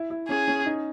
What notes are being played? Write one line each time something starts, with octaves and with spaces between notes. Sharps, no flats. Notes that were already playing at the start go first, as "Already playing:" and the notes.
Already playing: E4
E4
C#4 G#4
C#4
D#4